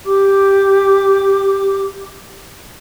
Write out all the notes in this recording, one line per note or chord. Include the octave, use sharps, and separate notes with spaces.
G4 D6